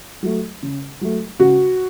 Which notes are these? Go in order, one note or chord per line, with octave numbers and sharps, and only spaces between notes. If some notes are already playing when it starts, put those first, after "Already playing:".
F#3 A3
C#3
F#3 A3
C#3 F#4